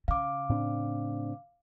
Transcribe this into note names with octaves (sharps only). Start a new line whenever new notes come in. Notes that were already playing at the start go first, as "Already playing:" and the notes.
C#3 F5 D6
A2 C4 D4